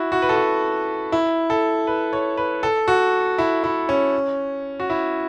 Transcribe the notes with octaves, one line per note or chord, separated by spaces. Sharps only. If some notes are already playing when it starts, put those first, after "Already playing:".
Already playing: E4 F#4
F#4
B4
A4
F#4
E4
A4
B4
C#5
B4
A4
F#4
E4
E4
C#4
F#4
E4